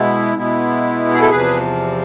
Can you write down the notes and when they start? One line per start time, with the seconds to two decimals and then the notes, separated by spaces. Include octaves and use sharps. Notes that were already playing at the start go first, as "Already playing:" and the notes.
Already playing: B2 G#3 B3 E4
0.37 B2 G#3 B3 E4
1.14 G#4
1.21 A4
1.30 E2 C3 F3 G#4 B4